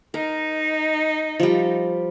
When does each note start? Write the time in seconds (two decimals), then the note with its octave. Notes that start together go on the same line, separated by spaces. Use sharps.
0.14 D#4 A#4
1.39 F3 G3